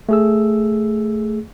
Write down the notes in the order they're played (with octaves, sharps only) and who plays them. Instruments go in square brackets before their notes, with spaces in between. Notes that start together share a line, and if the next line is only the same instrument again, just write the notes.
[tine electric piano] A3 G#4 E6